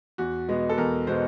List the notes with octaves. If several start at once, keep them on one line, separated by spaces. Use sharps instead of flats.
E2 F#4
B2 G#3 B3
A4
E2 A#4
B2 G#3 B3 C5